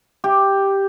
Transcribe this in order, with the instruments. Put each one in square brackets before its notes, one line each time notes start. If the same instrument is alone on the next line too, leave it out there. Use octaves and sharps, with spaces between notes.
[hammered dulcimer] G4